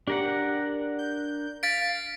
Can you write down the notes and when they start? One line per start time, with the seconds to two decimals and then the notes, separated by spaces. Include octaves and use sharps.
0.07 D4 G4 A#4 F#5
0.99 G6
1.63 F5 A6 B6 D7